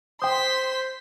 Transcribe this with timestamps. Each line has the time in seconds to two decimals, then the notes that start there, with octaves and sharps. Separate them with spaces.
0.22 C5 G5 C6 D#6 B6